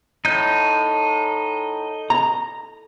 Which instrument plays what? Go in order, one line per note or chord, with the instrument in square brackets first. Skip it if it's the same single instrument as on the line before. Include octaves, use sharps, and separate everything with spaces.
[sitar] A2 [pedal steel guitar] D#4 G6
[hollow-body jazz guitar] A#5